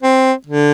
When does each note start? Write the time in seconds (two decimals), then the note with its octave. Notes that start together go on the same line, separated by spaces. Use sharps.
0.02 C4
0.46 D3